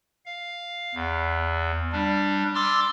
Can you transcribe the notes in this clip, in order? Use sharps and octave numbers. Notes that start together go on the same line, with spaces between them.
F5
E2
G3 D4
C6 D6 E6 F6 A6